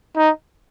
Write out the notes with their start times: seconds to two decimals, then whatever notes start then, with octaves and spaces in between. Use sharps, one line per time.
0.17 D#4